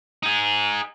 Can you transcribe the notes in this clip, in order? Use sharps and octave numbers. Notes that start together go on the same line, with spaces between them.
D#4 G#4